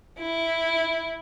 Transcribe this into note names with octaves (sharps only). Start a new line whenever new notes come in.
E4